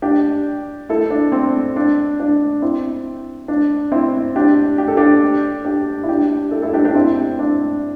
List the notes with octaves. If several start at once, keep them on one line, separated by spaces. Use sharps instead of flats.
D4 G4
E4 A4
D4
C4
D4
D4
C4 E4
D4
C4 E4
D4 G4
G4
A4
D4 G4
D4 G4
E4
D4 G4
E4 A4
E4 A4
D4 G4
D4 G4
C4 E4
D4